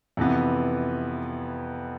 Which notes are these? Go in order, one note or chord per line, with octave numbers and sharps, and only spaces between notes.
F2 C3 E3 B3